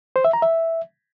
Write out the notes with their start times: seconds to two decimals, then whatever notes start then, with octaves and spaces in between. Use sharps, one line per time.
0.16 C5
0.25 E5
0.33 A#5
0.42 E5